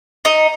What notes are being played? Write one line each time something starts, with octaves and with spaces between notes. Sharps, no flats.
D#4 D#5